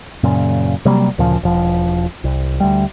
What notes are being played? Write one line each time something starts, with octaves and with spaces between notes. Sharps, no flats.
F#2 A#2 C#3
C3 F#3 G3 A#3
D2 A#2 C#3 F3
E1 F3
C2
D2 G3